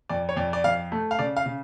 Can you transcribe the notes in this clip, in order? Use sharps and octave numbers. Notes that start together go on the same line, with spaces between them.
F2 D5
C#5
F2 D5
D5
F2 F5
A3
F5
C#3 D5
F5
C#3